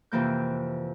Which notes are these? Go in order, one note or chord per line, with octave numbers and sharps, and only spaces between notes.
F2 C3 E3 A#3 G6